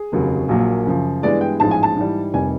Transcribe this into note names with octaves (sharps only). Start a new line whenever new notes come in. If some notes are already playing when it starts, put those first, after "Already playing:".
Already playing: G#4
F1 D#2 C#3 F#3
A#1 A#2 F#3 A#3
F#2 C#3 F3
G2 E3 G#3 B3 D5
G5
A1 G#2 F3 G#3 A5
G#5
A5
G#2 E3 G3
F1 C3 D#3 G3 G#5